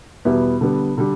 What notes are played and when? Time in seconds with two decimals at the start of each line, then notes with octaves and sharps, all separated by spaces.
0.25 E2 B2 G3 B3 E4
0.61 D3 G3 B3
0.98 D3 G3